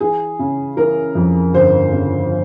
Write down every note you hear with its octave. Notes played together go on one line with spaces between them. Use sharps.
E3 G#4
C#3
E3 A#4
F2
G1 C5
C#3